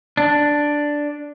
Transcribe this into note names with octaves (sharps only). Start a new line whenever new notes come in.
D4